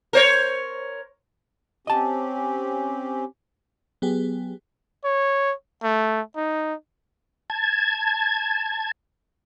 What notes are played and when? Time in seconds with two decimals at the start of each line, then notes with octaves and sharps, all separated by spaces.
0.13 A#4 C5 C#5
1.87 C4 C#4 G4 D#5 A5
4.02 F#3 B3 G4 G#4
5.05 C#5
5.83 A3
6.36 D#4
7.50 A5 G#6